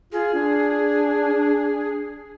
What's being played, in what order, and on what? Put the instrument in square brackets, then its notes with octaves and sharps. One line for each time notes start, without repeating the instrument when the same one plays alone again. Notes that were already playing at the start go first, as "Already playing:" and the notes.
[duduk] F4 [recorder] G#4
[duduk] D4